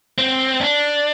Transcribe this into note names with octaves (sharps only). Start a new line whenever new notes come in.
C4
D4